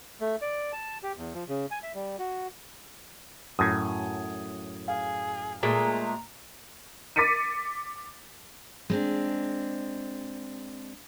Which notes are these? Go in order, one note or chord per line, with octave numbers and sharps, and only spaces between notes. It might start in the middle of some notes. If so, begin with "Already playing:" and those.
A3
D5
A5
G4
E2
F3
C#3
G#5
E5
G3
F#4
F#2 A2 D#6 G#6
G#4 F5
A#2 G#3 A3 A#5
D6 A6 B6 C#7 D#7
G#3 C4 D4